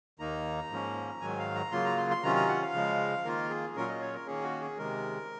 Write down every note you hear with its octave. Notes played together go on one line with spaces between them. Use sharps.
D#2 D#3 A#3 D#4 A#5
G#2 F3 A#3 C#4
G#2 D#3 F#3 G#5
F5
A#5
C#3 F#3 A#3 F4 C6
A#5
C6
C6
C3 D#3 F#3 C#4 F4 A#5
A#5
F#5
F5
C#3 F3 G#3
D#3 A#3 F4 A#4
G#4
A#2 F#3 C#4 F4 A#4
D#5
C#5
A#4
D#3 A#3 C#4 G#4
F#4
G#4
C3 D#3 G#3 A#4